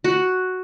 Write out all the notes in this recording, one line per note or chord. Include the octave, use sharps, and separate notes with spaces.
F#4